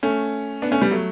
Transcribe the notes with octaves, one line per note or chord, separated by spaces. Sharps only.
A3 C#4
B3 D4
A3 C#4
G3 B3
F#3 A3